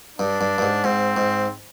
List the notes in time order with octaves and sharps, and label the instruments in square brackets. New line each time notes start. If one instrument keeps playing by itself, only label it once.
[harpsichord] G2 [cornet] D4
[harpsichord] G2
G2
G#2
[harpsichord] G#2 [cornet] C4
[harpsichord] G#2